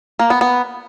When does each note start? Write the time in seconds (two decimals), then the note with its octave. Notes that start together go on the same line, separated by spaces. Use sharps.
0.19 A#3
0.30 B3
0.41 B3